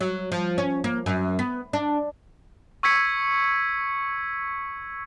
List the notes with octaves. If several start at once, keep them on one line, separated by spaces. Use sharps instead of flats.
F#3
F3
C#4
A#3
F#2
B3
D4
C#6 E6 G#6 B6 C#7